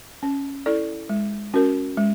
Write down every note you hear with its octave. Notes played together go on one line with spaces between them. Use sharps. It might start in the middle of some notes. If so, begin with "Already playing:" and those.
C#4
E4 A4 D5
G#3
C#4 F#4 A#4
G#3